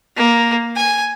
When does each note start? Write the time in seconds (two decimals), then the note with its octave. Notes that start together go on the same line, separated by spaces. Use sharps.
0.17 A#3
0.76 G#5